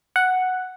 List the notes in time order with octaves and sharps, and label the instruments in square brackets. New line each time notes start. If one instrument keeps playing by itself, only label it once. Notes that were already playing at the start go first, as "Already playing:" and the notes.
[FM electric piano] F#5